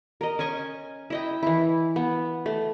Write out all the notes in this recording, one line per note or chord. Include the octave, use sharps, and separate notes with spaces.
A#4 D#5
C#4 D#5 G#5 C#6
E4 D#5 G5
E3 E4
B3
A3